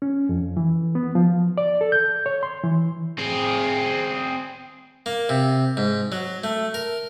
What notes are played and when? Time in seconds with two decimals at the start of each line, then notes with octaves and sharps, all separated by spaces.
0.02 C#4
0.29 F2
0.57 E3
0.95 B3
1.15 F3
1.58 D5
1.81 A4
1.92 G6
2.26 C#5
2.43 C6
2.64 E3
3.18 C4 G#4
5.06 A#3
5.29 C3
5.77 G#2
6.12 F#3
6.44 A3
6.74 A#4